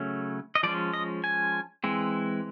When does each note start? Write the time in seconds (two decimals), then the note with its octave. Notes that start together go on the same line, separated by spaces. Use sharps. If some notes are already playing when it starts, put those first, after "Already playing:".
Already playing: C#3 F#3 A3 C#4
0.55 D#5
0.63 F3 G#3 C#4 D5
0.94 D#5
1.24 G#5
1.84 E3 G#3 C4